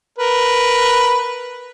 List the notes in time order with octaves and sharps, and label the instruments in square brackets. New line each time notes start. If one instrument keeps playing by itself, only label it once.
[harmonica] A#4 B4